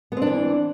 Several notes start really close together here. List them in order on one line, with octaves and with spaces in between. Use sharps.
B3 C4 D4 E3